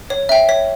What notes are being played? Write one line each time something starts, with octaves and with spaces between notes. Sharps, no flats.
C#5
E5 G5
C#5 B6